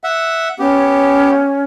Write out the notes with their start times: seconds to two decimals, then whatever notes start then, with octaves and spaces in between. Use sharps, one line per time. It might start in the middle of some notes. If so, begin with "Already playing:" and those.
0.04 E5 F#5
0.59 B3 C#4 G4